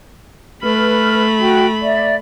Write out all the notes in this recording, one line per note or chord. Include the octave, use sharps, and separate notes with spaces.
A3 B4 B5 F6
F#4 G5
D5 E5